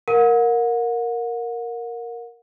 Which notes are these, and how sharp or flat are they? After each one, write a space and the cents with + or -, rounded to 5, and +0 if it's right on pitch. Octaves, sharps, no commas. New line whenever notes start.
A#4 +0 F#5 -40